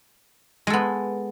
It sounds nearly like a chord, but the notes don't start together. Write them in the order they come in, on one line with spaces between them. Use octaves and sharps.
G#3 A4 B3